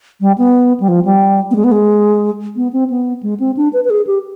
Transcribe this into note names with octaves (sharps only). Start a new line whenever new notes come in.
G3
B3
G3
F3
G3
B3
G#3
B3
G#3
B3
C4
B3
G#3
C4
D4
B4
B4
G#4
G4